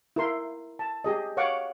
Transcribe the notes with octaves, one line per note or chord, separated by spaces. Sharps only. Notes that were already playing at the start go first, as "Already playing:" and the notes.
E4 A#4 C6
A5
G4 G#4 D#5
C#5 F5 F#5 C#6 D6